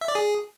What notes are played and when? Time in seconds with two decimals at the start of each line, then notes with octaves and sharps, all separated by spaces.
0.01 E5
0.08 D5
0.15 G#4